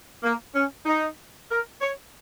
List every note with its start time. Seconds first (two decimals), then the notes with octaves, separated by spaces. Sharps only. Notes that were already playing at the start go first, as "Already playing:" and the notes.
0.23 A#3
0.54 C#4
0.86 D#4
1.49 A#4
1.81 C#5